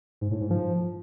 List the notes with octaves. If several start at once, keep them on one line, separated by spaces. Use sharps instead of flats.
G#2
A2
G#2
F3